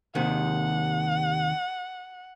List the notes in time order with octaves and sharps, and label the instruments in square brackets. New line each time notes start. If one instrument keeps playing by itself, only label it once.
[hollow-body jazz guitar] D#2 C3 D#3 [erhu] F#5